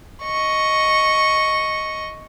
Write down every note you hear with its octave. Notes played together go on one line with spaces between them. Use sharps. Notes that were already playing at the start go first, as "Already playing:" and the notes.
D#5 C#6